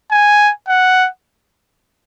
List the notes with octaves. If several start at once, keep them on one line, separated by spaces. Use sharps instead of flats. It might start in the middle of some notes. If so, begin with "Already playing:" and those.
G#5
F#5